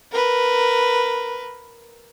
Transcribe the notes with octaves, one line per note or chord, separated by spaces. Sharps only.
A#4 B4